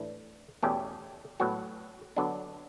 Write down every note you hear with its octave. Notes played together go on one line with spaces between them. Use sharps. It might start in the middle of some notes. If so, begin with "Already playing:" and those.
Already playing: A2 E3 D4
E2 B2 A3 C#4 G4
A2 F#3 B3 F#4
D3 F#3 B3 D4